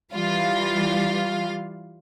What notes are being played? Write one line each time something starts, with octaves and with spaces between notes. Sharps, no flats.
E3 G3 F4 F5